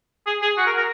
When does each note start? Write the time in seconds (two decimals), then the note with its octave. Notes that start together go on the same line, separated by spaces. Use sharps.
0.27 G#4
0.42 G#4
0.57 F#4
0.66 A#4
0.77 A#4